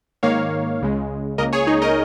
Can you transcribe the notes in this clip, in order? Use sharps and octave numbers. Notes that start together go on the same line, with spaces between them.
G#2 D#3 A#3 C#5 F5
C#2 C#3 G#3
C#2 C#3 A#3 A#4 D#5
G#4 C#5
D#4 G#4
A#4 D#5